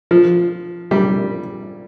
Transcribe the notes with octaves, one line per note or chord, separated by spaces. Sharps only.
F3
G3